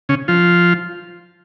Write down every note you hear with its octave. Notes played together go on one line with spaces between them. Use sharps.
C#3 C#4
F3 F4